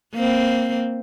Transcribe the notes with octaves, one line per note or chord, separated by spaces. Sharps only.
A#3 C4